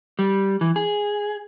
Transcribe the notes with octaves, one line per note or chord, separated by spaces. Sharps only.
G3
E3
G#4